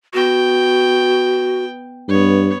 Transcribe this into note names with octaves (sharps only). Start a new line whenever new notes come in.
B3 F#4 G5
G2 B3 C#5